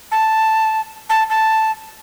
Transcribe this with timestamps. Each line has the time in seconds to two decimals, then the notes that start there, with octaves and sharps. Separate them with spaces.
0.12 A5
1.10 A5
1.30 A5